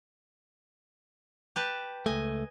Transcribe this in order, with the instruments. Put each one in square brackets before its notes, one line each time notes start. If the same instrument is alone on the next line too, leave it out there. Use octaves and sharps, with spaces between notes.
[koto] G4 B4 A5
[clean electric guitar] C#2 A3 [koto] D#5 G#5